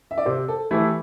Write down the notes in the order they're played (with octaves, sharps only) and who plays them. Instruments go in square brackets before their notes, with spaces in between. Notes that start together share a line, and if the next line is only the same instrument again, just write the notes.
[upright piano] E5
D5
[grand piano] C3 [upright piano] C5
[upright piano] A4
[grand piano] E3 A3 E4 [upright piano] G4